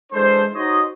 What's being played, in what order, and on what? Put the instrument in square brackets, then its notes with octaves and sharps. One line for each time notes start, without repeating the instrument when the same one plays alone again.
[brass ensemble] E3 G#3 D4 A4 C5
D#4 F#4 C5 C#5 D#5